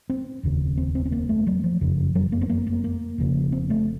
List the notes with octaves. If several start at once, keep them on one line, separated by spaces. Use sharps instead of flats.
C4
F1 D#2 C#3
C4
C4
C4
A#3
A3
F#3
F3
F#1 F2 C#3
F#3
A#3
C4
A#3
A#3
A#3
F1 F2 C#3
C4
A3